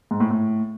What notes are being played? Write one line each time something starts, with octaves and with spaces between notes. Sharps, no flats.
G#2
A2
A2